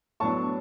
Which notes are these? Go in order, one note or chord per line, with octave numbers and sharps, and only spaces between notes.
A2 F#3 B3 D4 A5 C#6